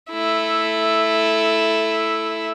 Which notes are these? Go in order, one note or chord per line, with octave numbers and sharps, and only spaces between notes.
A3 E4